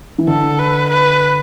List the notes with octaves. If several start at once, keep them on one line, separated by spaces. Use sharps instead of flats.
E3
D3 A4
B4
B4